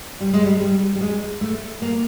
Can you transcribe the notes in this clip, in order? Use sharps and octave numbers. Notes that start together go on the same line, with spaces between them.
G3
G#3
G3
G3
G3
G#3
A3
A#3